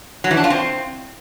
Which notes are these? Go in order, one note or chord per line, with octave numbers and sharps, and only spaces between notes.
F#3
E3
D4
F4
C4